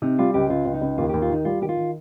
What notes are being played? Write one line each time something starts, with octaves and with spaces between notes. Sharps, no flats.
C3 D#4
G3 F4
C#2 G4
C#2 F4
C#2
D#4
C#2
D#2 F4
D#2 G4
F4
D#3 D#4
G3 F4
D#3 G4
F4
D#3